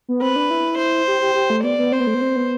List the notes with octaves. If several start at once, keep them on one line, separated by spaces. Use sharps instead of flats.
B3
C4 B4
D4
E4
C5
G4
G4
G4
A3
B3 D5
B3
C4 C5
B3
A3
B3
C4
B3